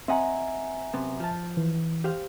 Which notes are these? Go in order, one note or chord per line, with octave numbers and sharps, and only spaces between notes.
C4 D#5 E5 F#5 G#5 A#5
F#2 C3 B3
F3 A5
E3
G4 C5 F5